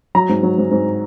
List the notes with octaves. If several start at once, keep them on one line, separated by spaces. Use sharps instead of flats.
F#3 A#5
G#2
F#3
G#2
G#2